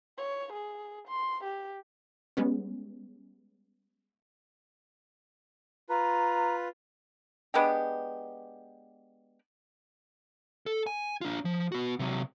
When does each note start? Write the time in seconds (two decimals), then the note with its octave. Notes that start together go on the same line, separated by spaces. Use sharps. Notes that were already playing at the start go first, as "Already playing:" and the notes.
0.18 C#5
0.53 G#4
1.08 C6
1.44 G4
2.37 G3 G#3 B3 C#4
5.89 F4 B4 A#5
7.54 G#3 B3 D4 G4
10.66 A4
10.87 G#5
11.21 D4 F4
11.45 F3
11.72 B3 F#4
11.99 C3 F#3